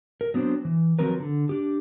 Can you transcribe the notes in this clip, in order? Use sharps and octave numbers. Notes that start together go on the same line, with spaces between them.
A#4
F#3 B3 C4 D4 C5
E3
D#3 F3 F#3 C4 A#4 B4
D3
D4 G4